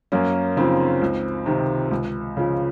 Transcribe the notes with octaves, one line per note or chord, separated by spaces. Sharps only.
F#2 A#3 C#4
C#3 F3 C4 D#4
C#2
C3 D#3
C#2
C#3 F3